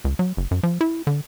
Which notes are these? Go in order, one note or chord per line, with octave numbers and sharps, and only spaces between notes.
C#2
F#3
F#1
F#2
F3
E4
D3